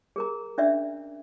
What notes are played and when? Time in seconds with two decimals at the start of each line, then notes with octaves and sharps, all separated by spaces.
0.16 G#4 A#4 A#5
0.58 C#4 D4 D5 E5